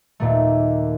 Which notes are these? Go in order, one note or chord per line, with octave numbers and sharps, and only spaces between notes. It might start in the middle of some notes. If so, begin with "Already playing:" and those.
D#2 A#2 A3